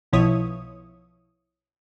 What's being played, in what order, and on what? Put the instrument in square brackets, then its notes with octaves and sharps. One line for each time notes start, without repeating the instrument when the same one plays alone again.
[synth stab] B1 B2 F3 E4 C#5 D#6